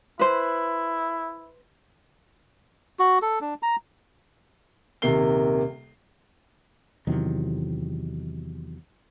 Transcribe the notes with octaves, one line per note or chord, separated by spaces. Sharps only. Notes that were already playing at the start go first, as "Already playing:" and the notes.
E4 B4 C5
F#4
A4
D4
A#5
D#1 C3 D#3 A#3 C7 G7
E2 C3 D#3 F#3